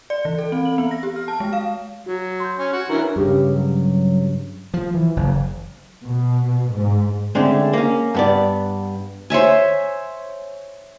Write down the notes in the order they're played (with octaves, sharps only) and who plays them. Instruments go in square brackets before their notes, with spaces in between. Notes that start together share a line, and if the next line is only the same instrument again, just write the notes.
[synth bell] D5
E3
A4
C4
F#7
B3
A#6
G4
F6
A5
G#3
F5
[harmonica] F#3 [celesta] F#4
[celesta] C6 G6
[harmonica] C#4
F#4
[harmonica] E3 C#4 A#4 [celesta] D4
[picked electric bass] G2 C#3 [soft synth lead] G4
[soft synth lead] F#3
[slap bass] F3
E3
F#1
[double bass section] B2
G#2
[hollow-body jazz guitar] D3 G#3 A3 C4 C#4
A#3 C#4
G2 B3 D5
[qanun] C5 C#5 E5 G#5